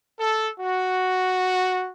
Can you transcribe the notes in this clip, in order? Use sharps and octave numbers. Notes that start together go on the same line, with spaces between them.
A4
F#4